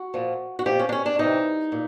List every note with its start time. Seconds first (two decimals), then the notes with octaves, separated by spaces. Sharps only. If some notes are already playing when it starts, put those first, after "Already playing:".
Already playing: F#4
0.14 A#2 F3
0.59 F#4
0.66 A#2 F3 G4
0.79 C#4
0.89 D4
0.92 C#4
1.06 D4
1.19 C3 E3 D#4
1.72 A#2